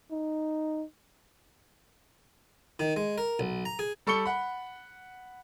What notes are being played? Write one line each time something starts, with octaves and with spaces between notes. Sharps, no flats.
D#4
D#3
G#3
A#4
B1
A#5
G#4
G3 A4 C#6 C#7 G7
F#5 B5